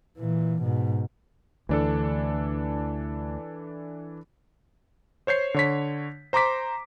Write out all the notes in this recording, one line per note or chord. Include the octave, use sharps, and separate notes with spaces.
A#2 E3
G#2 B2
D2 E3 D4 A4
C5 C#5 G6 C7
D3 C#5 B6
C5 A#5 C6 D6 B6